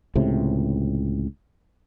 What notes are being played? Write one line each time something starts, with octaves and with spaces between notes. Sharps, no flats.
C#2 A2 C3